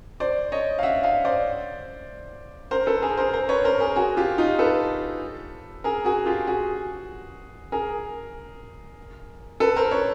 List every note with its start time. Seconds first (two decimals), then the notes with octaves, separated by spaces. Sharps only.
0.20 C5 D5
0.52 C#5 D#5
0.79 F5
0.83 E5 F#5
1.03 D#5 F5
1.25 C5 D5
2.71 A#4 C5
2.86 A4 B4
3.02 G#4 A#4
3.17 A#4 C5
3.33 A#4 C5
3.49 B4 C#5
3.65 A#4 C5
3.80 G#4 A#4
3.96 F#4 G#4
4.17 F4 G4
4.38 D#4 F4
4.59 A4 B4
5.84 G#4 A#4
6.05 F#4 G#4
6.26 F4 G4
6.47 F#4 G#4
7.72 G#4 A#4
9.60 A4 B4
9.76 A#4 C5
9.91 B4 C#5